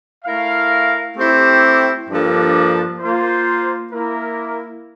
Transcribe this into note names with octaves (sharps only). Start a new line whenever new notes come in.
A3 E4 A#4 F5
A3 C4 E4 G4 C5
G2 F3 A#3 D4 A4
A#3 F4 C5
A#3 E4 A#4